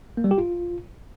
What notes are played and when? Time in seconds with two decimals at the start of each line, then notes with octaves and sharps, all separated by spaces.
0.17 A#3
0.24 G3
0.31 G4
0.38 F4